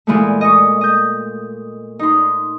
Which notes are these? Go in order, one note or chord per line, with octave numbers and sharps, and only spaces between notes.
A#2 E3 G#3 A3
D#5 C#6
D#5 G6
D#4 C6